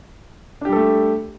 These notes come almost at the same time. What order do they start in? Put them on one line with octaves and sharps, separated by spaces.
D4 G4 G3 A4 A3